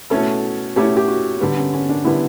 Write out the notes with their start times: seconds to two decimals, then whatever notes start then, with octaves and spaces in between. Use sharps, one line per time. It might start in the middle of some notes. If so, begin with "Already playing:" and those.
0.10 B2 A3 C#4 E4 A4
0.76 B2 A3 C#4 E4 G4
0.97 G4
1.08 F#4
1.40 D3 G3 B3
1.57 C#4
1.73 C#4
1.89 D4
2.05 D3 G3 B3 E4